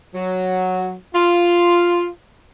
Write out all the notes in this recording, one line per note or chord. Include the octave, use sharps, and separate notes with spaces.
F#3
F4